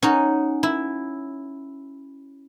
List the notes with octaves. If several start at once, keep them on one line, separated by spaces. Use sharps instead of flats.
C#4 D#4 F#4
E4